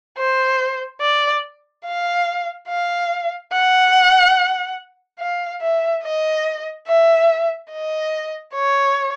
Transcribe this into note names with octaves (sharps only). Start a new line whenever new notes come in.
C5
D5
F5
F5
F#5
F5
E5
D#5
E5
D#5
C#5